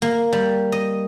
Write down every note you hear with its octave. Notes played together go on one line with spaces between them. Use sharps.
A#3
G3
D#5